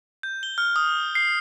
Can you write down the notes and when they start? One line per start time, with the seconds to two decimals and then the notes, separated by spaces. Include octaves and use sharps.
0.23 G6
0.43 G7
0.58 F6
0.76 D#6
1.15 C7